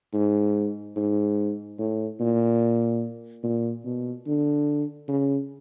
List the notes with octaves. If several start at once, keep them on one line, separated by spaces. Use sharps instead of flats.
G#2
G#2
A2
A#2
A#2
B2
D3
C#3